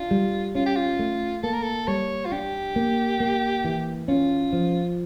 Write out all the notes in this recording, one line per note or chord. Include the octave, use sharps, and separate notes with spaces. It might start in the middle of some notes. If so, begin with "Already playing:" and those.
Already playing: D4 F4
G3
C#4 F4
G4
F4
A3
A#3 A4
A#4
A4
G3 C#5
F4
D4 G4
A#3
A#3
E3
C#4 F4
F3